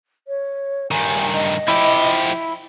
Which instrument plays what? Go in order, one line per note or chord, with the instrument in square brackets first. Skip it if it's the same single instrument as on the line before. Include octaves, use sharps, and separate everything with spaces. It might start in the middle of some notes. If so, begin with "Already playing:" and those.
[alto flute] C#5
[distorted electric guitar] G2 D#3 [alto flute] G#5
[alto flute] D#5
[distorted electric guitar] F3 G4 [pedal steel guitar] E4